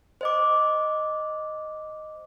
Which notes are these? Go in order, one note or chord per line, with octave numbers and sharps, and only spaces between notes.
C5 D#5 D6